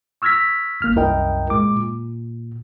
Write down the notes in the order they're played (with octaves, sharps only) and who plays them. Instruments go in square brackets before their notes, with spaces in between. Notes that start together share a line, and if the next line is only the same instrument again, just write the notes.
[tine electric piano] C#6 E6 F6 G#6 A#6 B6
G#1 A#3 F6
C2 F#2 E4 A#4 D#5 G5
A#2 G#3 D6
A#2